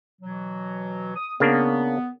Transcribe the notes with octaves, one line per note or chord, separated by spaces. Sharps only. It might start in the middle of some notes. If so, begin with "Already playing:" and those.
B2 E3 F#3
D#6
C#3 A#3 B3 D4